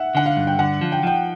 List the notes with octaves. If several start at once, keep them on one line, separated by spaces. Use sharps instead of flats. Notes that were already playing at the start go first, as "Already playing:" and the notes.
Already playing: E5 F#5
D3 F#5
F5
G2
G5
D3 F#5
F3
G5
F3 G5